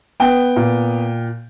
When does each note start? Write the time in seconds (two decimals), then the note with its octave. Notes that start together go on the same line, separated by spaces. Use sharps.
0.20 B3 G5
0.56 A#2